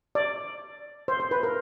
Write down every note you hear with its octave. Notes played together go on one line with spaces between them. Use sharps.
D5
C5
C5
B4
A#4